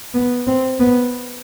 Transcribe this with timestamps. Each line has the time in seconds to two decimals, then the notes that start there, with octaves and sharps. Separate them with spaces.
0.14 B3
0.47 C4
0.80 B3